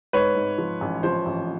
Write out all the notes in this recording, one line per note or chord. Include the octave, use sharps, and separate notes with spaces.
G#2 B4 C#5
G#2
F3
A1
F3 C5
A1